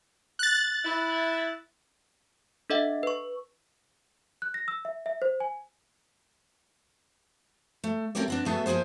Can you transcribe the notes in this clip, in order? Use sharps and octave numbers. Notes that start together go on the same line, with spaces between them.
F#6 A6
E4
D4 A4 D#5 E5 F#5
B4 C#6
F#6
A#6
E6
E5
E5
C5
G#5
A3
A3 C4 C#4 G4 A#4 D5
B3 C4 D4
F#3 A3 B3 G#4 A4 E5
F3 A#3 E4 G#4 C5